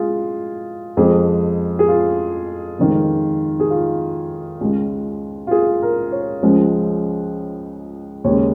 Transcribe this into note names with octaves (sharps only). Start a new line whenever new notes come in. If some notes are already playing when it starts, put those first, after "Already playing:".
Already playing: G#3 F4 G#4
F2 F3 G#3 G#4
G#4
F4
F2 D#3 G#3
G#4
F4
C#2 C#3 G#3
F4
G#4
A#4
C#5
C#2 C#3 F3 G#3
D#2 C#3 G#3 C#5